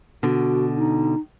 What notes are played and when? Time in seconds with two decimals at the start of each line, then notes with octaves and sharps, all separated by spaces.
0.23 B2 D3 F#4
0.77 D#4